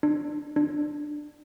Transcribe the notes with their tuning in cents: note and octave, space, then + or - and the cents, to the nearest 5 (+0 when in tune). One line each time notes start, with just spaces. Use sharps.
D4 +25
D4 +15